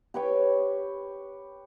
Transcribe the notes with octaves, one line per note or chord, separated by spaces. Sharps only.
G4 B4 C#5 G5